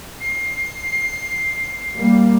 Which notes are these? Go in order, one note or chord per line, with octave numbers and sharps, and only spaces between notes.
C7
G3 A#3